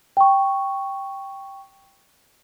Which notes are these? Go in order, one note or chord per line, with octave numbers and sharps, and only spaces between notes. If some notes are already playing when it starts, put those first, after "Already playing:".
G5 C#6